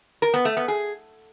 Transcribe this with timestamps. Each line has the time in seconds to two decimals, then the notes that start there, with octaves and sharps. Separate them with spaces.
0.22 A#4
0.34 B3
0.45 A3
0.57 B3
0.68 G#4